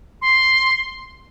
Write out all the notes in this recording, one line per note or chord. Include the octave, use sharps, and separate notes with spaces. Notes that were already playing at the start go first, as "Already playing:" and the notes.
C6